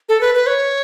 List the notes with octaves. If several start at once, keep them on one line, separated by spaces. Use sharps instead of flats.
A4
B4
B4
C#5